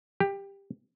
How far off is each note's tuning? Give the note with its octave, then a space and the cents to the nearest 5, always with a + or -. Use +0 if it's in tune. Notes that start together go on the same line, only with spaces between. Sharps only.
G4 +15